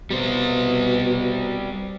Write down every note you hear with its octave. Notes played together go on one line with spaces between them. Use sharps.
B2 G3 C5